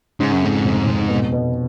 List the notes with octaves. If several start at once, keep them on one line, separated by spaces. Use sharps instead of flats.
G#2 C#3
F#2
F2 G#2
F1
F1
B2
B2